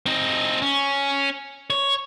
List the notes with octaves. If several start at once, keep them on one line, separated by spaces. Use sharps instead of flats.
C4 D#4
C#4
C#5